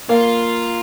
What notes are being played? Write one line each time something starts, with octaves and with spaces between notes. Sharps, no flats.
A#3 F4